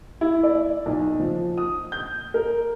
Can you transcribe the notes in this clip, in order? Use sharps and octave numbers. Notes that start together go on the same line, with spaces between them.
E4
D5
B1
F3
D#6
G6
A#4